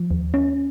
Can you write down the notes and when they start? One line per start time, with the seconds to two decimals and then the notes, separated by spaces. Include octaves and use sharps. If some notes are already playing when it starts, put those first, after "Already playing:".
Already playing: F3
0.11 D#2
0.34 C#4